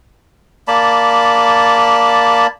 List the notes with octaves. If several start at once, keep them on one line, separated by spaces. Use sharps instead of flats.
A#3 D5 A5 B5